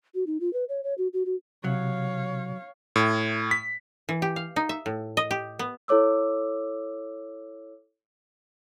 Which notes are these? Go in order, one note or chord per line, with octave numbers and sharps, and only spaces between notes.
F#4
D#4
F4
B4
C#5
C#5
F#4
F#4
F#4
C3 F#3 C#5 F5
A2
B6
E3
G4
F5
D#4
E5
A2
D#5
G4
B3
E4 A4 C#5 D6 E6